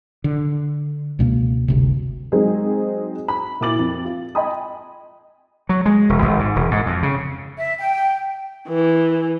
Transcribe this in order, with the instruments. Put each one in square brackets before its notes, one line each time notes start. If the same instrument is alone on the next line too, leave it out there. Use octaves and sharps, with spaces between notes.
[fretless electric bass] D3
C#2 B2 A3 A#3
G1 D2 C3
[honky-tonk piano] F#3 G#3 C4 D#4 G#4
B5
A#2 E4 F#4 D6 A6 F#7
F2
F4
D#5 G5 G#5 B5 C6 D#6
[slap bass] F#3
G#3
E1
G#1
G#2
E1
G#2
F2
C#3
[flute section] E5
G5
[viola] E3